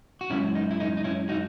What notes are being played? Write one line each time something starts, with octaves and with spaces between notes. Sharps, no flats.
F#4
F#2 C#3 G#3 C#4 E4
D#4
E4
D#4
D#4
C#4 E4
D#4 F#4